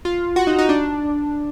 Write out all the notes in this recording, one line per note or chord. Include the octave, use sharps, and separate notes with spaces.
F4
F#4
D#4
D#4
D4